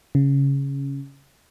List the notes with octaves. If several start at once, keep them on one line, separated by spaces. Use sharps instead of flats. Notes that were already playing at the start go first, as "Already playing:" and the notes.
C#3